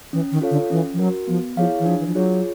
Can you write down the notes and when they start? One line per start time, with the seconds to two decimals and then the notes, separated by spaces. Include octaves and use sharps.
0.13 E3 C#4
0.32 D#3
0.41 F4 A4 C#5 F5
0.51 D3
0.70 E3 C#4
0.93 F3
0.99 F#3 A#4
1.03 F#4
1.27 F3 B3
1.56 F3 E4 G#4 C#5 F5
1.80 E3
1.86 F3 D4
2.00 E3
2.07 F3
2.15 F#3 F4 G#4 C#5